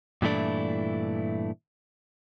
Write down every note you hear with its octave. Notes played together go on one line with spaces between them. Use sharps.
G2 A#2 E3 A3 D4 E4